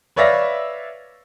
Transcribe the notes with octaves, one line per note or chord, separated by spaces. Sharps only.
B4 C#5 D5 E5 F5 A#6